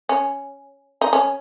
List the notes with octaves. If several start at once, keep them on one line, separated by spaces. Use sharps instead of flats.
C#4
D#4
C#4